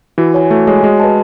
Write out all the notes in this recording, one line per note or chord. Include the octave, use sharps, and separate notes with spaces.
E3 F#4
C#5 G#5
A3 F#4
G#3 C#5 G#5
G#3 F#4
B4 D#5 A5